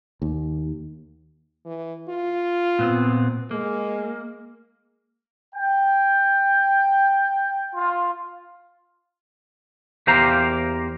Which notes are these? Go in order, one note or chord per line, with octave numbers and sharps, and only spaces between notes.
D#2
E3
F4
A#2 B3 C4
G#3 A#3
G5
F4
E2 A#3 G4 C5 F5 A#5